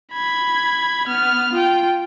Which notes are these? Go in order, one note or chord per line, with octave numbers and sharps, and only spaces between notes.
B5 G#6
B3 F6
F4 G5